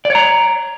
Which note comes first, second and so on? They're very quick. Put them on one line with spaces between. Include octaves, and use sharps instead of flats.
D5 C#5 A#5